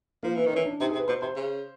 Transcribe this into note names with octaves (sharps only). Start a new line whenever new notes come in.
F3 A#3
E3 B3
D#3
E3 C#4
D4
C3 D#4
G#4
C3
B4
B2 C5
C3 C5
C#3